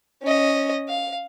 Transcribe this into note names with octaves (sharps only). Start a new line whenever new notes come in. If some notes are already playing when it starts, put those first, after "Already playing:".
C#4 D#5
F5